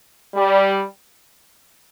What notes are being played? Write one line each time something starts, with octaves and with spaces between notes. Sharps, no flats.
G3